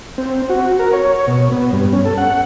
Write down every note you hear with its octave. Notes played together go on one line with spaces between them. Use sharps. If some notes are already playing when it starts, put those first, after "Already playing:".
C4
F#4
A#4
C#5
B2
B3
G2
C#4
A4
F#5